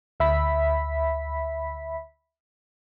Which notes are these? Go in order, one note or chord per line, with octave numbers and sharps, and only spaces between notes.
D2 E5 B5 B6